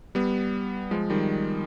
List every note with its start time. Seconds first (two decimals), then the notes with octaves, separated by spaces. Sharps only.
0.15 G3 B3
0.91 F3 G#3
1.10 D#3 G3